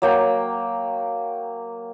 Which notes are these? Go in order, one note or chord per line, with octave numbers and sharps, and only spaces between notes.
F#3 A#3 G5